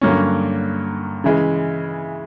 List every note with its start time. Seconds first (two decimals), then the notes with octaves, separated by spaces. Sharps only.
0.01 G2 D3 F#3 A#3 C#4
1.24 C#3 E3 G#3